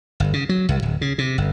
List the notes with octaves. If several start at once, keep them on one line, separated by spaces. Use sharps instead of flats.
G1
C#3
F#3
C2
D1
C#3
C3
G1